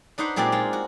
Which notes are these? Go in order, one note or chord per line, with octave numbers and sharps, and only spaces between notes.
D4 D#4 B4 C5 F#5
A#2 G#3 C4 G4 A#4 D5
G#3 F4
F#4